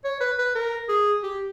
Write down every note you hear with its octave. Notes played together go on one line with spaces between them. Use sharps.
C#5
B4
B4
A#4
G#4
G4